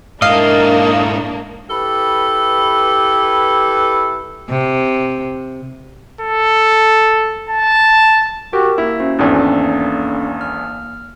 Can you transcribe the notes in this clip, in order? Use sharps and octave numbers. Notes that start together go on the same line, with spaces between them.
G#2 A#3 D4 E4 D#5 F5
E4 G4 A4 B4
C3
A4
A5
F#4 G4 A#4
A#3 E4 E5
C#4 F#4 C5
G#1 E2 C#4 D4 A4
F6